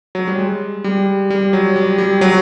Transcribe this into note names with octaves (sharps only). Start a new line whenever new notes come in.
F#3
G3
G#3
G3
G3
F#3
G3
G3
F#3